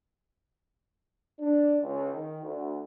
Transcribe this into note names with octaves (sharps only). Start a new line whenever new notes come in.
D4
C#2
D#3
D2